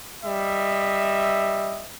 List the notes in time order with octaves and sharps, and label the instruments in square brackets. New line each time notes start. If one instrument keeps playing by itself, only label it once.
[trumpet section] G3 D#5 E5